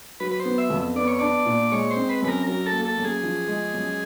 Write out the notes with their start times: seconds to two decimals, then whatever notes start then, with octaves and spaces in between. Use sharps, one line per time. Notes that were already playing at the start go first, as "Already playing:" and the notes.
0.20 F#3 B4
0.31 B4
0.40 C5
0.45 B3
0.58 E5
0.70 F2
0.96 B3 D5
1.08 C#5
1.19 D4 D5
1.46 A#2
1.72 G#3 C#5
1.90 C5
1.96 C4
2.09 B4
2.22 F#2 B4
2.28 A#4
2.47 F#3 A#4
2.66 A4
2.72 A#3
2.85 A4
2.98 F#2
3.05 G#4
3.23 F3
3.48 G#3
3.74 F#2